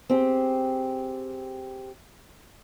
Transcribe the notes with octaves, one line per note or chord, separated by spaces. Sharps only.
C4 G4 G#4